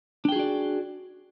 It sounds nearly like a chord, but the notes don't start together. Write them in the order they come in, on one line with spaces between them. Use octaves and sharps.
D4 G5 G#4 F#4 D5